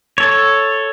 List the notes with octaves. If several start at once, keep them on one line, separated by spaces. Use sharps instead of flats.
A4 C#5